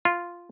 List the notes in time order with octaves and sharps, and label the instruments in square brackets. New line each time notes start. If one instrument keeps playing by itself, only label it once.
[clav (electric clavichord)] F4